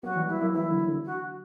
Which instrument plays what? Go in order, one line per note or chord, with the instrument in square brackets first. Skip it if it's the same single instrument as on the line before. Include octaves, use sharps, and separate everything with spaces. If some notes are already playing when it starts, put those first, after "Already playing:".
[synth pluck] F#3 A#3 [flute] F#4
[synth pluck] E3 G3
[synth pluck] E3 G3 [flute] E4
[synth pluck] F#3 A#3
[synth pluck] E3 G3 [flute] E4
[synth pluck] D3 F#3
D3
[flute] F#4